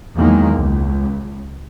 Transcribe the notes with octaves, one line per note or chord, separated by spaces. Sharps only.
E2 D#3 F#3 G#3 A#3
C#2